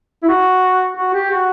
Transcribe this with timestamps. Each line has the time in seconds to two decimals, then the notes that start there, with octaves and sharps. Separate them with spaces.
0.23 E4
0.28 F#4
0.97 F#4
1.14 G4
1.31 F#4